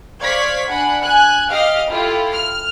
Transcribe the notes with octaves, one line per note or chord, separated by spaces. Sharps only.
C5 D5 F5 C#6 G#6 B6
D4 F#5 G#5 B5
G#5 F#6
G4 D#5 F5 F6
E4 F4 G4 A4
F6